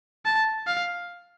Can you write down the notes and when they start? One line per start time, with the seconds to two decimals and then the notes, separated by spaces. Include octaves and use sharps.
0.25 A5
0.67 F5